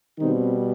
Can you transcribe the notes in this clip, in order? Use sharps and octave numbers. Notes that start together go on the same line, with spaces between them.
B2 D#3 G3 C4 D#4